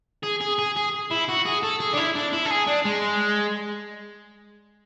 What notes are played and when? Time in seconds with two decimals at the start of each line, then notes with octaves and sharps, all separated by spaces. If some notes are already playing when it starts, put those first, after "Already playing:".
0.24 G#4
0.41 G#4
0.59 G#4
0.76 G#4
1.11 E4
1.28 F#4
1.45 G#4
1.63 A4
1.80 G#4
1.93 D4
1.98 E4
2.15 D4
2.33 E4
2.46 A4
2.51 G#4
2.67 D4
2.85 G#3